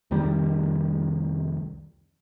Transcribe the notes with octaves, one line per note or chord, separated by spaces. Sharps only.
C2 F2 D#3 G3